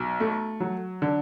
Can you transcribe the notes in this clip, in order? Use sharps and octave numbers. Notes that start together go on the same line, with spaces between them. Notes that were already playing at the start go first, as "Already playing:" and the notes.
Already playing: B1
A3
F#3
D3